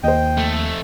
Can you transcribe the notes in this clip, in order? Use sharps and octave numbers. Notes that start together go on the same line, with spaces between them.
D#2 C5 D#5 G5
F2 A3